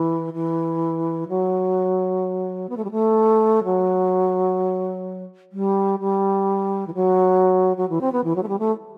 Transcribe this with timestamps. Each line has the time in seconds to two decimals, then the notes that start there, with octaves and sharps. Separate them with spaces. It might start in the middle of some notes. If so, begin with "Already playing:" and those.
Already playing: E3
0.34 E3
1.28 F#3
2.69 B3
2.77 A3
2.84 G3
2.91 A3
3.64 F#3
5.52 G3
6.00 G3
6.87 E3
6.95 F#3
7.77 F#3
7.89 E3
8.01 C4
8.12 B3
8.24 E3
8.36 F#3
8.43 A3
8.48 G3
8.59 A3